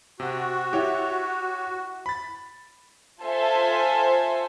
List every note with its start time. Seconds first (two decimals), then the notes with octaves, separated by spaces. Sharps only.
0.20 C3 F#4
0.73 E4 G4 C#5 E5 A6
2.06 B5 A6
3.22 F4 A4 C5 E5 G#5